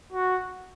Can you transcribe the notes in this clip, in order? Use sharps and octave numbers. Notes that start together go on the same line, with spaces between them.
F#4